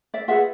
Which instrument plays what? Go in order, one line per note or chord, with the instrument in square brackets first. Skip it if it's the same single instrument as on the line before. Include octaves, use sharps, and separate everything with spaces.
[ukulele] D5 E5
F4 G#4 B4 E5 F#5